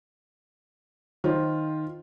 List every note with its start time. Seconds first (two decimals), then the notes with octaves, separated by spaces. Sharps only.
1.24 D#3 F4 C5